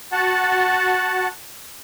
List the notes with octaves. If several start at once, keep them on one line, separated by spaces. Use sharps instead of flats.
F#4 F#5 A5